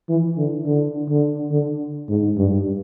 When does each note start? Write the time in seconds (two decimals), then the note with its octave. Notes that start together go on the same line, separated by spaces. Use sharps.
0.09 E3
0.37 D3
0.66 D3
1.09 D3
1.51 D3
2.08 G#2
2.37 G2